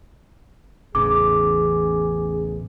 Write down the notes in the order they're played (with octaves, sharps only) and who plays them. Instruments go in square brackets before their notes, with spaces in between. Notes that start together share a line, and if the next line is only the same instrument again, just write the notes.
[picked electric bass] A1 E2 C#3 [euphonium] G#4 [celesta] D6